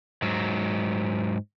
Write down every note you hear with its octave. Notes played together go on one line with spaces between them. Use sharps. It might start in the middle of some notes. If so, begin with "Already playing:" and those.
G#2 F#3